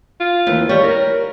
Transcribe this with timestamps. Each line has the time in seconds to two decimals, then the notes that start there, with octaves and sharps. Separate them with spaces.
0.21 F4
0.47 D#2 E3
0.69 G3 C#5
0.83 A#4